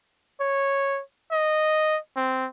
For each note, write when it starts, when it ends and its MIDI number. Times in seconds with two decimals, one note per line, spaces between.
0.40 1.01 73
1.32 1.98 75
2.16 2.47 60